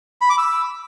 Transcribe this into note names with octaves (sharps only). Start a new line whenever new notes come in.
B5
D6
E6